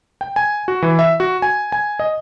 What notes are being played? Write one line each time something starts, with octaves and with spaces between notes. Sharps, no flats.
G5
G#5
F#4
E3
E5
F#4
G#5
G#5
D#5